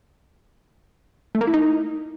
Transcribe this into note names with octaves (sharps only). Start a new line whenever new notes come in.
A3
A#3
E4
D#4